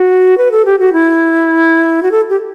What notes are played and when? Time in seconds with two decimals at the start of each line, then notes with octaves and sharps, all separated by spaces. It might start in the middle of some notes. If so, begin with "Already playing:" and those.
Already playing: F#4
0.38 B4
0.52 A4
0.65 G4
0.79 F#4
0.93 E4
2.03 F#4
2.11 A4
2.30 G4